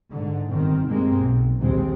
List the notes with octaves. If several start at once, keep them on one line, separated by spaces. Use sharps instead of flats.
G#2 D3
G1 D#3 C4
G2 A#2 G#3 A#3 C4
B1
A#1 D#2 G#3 C4